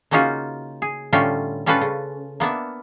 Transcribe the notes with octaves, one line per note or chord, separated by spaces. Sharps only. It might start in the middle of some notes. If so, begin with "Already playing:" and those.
C#3 A#3 C#4 D#4 F4 F#4
G#4
A2 D3 G3 A3 C#4 F4
G3 C#4 F4 A4 B4
C#3
A#3 B3 D4 E5